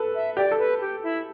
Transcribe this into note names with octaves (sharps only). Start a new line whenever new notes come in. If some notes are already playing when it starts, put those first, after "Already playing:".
Already playing: A4 B4
E5
G4 D5
A4
B4
G4
E4